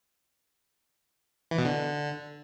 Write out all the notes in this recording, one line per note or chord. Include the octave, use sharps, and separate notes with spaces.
E3
B2
D3